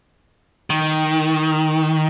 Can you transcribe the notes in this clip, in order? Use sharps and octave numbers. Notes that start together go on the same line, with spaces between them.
D#3